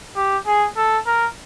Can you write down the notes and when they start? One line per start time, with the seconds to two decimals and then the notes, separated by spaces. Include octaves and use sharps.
0.16 G4
0.47 G#4
0.77 A4
1.07 A#4